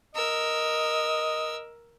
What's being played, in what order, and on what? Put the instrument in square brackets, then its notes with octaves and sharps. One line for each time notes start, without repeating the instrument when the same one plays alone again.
[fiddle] A#4 E6 [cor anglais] D#5